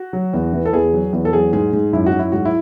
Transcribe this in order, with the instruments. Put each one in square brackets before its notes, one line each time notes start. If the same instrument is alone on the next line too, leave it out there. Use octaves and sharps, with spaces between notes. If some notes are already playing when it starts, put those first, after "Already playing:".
Already playing: [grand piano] F#4
F#3
E2
E3
A4
E2 G#4
F#3
E2
A4
F#3 G#4
G#2 G#4
G#2
F#2 E4
F#4
F#3
E4
G#2 F#4
E4